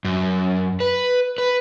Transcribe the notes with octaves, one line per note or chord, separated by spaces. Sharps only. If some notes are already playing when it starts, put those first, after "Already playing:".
F#2
B4
B4